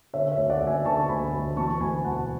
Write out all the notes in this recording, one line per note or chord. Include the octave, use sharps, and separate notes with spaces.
D3 C#5 E5
C#5 E5
D2
D5 F#5
D2
E5 G#5
D3 A5 C#6
D2 G#5 B5
D2
E3 A5 C#6
D2 G#5 B5
E1 F#5 A5